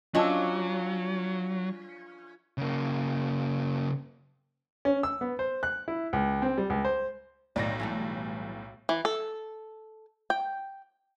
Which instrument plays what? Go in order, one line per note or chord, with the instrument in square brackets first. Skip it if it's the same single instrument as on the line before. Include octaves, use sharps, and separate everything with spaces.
[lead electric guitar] F#3 [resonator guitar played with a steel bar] C#4 D4 [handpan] F4 [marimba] D#5 A5 E6
[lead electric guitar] C#3 A#3
[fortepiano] C#4
E6
B3
C5
F#6
E4
C#2
C4
G3
C#2
C5
[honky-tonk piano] B1 A2 A#6 [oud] D#3 F#3 D5
[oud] E3 G3 A3
[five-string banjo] E3
A4
G5